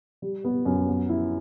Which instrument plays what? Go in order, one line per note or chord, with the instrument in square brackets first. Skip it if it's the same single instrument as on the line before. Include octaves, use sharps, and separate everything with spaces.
[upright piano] G3
B3
F#2
B3
E4